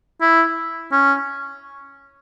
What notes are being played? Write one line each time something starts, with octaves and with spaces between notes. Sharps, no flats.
E4
C#4